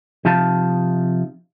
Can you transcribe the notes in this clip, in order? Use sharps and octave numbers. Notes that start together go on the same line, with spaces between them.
C3 F3 D#4 F5 A5